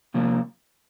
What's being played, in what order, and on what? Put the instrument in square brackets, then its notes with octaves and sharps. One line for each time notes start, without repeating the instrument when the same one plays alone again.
[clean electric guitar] C3 F3 A#3